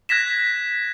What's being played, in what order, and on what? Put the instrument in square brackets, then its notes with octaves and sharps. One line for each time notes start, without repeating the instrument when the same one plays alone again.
[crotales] F#6 G#6 A#6 B6 E7